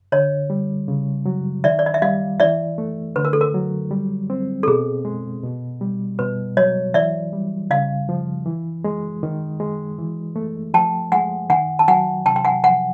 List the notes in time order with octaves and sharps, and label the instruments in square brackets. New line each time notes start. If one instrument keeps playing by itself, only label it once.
[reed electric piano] D3 [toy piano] C#5 D#5
[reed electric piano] G3
C#3
F#3
[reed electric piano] D#3 [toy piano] D5 E5
[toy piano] D5
D#5
E5
[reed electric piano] G3 [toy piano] D#5 F5
[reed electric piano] E3 [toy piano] D5 E5
[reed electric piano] A3
[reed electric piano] D3 [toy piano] B4
[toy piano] A#4
A4
A#4
[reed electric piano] F#3
G3
C4
[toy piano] A4
[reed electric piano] B2 [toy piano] G#4
[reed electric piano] G#3
B2
G3
[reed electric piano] B2 [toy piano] B4
[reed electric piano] F#3 [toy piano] C#5 D#5
[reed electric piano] E3 [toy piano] D5 E5
[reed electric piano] G3
[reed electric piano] C#3 [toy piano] D#5 F5
[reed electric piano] F3
E3
G#3
D#3
G#3
E3
A3
[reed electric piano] F3 [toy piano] G5 A5
[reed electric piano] G#3 [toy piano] F#5 G#5
[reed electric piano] D#3 [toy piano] F#5 G#5
[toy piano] A5
[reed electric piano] F#3 [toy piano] F#5 G#5
[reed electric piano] C3 [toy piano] G5 A5
[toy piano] G5
F#5 G#5
[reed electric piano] F3 [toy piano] F#5 G#5